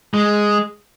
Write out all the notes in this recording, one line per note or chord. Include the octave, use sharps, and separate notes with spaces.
G#3